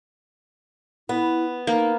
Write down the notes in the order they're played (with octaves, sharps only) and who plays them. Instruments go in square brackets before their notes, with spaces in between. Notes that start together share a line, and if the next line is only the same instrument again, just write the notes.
[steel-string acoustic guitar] B3 [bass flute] E4
[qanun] A#3 [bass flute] D#4